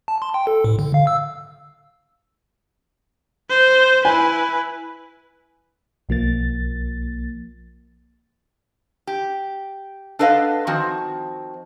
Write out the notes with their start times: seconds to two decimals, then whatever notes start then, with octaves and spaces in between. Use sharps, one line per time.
0.08 A5
0.22 C6
0.34 G5
0.47 A4
0.64 A2
0.79 D3
0.94 F5
1.07 E6
3.50 C5
4.05 E4 B4 G#5
6.09 B1 F3 A#3 A6
9.07 G4
10.19 D4 A4 B4 D#5 F5 F#5
10.67 D#3 F3 C4 F#4